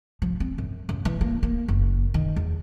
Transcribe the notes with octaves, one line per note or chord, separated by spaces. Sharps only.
F3
C4
F#2
F#2
E3
A#3
A#3
F#1
D#3
E2